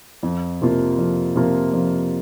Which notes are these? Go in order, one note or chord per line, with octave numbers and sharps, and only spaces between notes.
F2
C3 F3 A#3 F4
F2
C3 F3 A#3 F4
F2